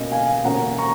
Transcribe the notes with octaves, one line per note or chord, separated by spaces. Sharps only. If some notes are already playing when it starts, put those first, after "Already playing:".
Already playing: B2 A#3 C#4 D#5
F5 G#5
B2 A#3 C#4 F#5 A#5
A#5 C#6